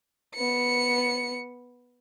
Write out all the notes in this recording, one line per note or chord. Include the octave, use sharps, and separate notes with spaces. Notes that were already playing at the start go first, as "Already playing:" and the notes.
B3 C#7